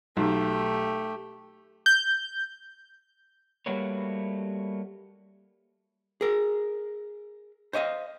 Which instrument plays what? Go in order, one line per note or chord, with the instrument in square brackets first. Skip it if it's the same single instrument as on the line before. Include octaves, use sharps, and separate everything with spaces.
[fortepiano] B1 [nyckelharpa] A3 G4
[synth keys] G6
[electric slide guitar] G3 A3 A#3 F#4 B4 C#5
[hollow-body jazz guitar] G#4 A#4
C5 C#5 D#5 F5